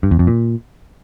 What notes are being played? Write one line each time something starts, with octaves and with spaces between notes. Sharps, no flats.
G2
E2
F2
A#2